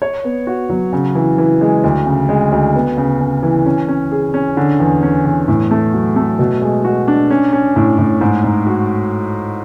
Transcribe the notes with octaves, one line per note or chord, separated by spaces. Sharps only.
C#5
B3
F#4
F#3
C#3
E3
E3
G#3
D2
C#3
G#3
D2
B3
C#3
C#3
E3
C#4
C#4
G#4
C#4
D3
E2
C#4
E2
A2
A3
F#3
A3
B2
G#3
F#4
D4
C#4
C#4
A2
A2
G#2
G#2
F#4